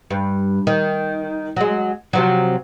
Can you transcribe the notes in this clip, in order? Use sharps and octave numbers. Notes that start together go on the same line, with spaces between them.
G2
D#3
F#3 G#3
C3 F3 F#3